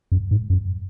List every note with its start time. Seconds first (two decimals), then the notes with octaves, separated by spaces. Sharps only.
0.12 F#2
0.31 G#2
0.50 F#2